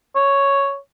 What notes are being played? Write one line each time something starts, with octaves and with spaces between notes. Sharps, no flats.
C#5